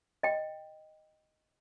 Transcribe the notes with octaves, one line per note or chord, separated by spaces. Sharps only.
D#5 G5